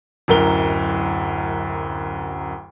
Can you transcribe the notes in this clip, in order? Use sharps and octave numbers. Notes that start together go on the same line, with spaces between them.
D1 F#2 A#4 G7